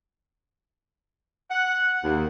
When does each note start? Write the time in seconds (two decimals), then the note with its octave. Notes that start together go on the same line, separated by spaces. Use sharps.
1.51 F#5
2.04 D#2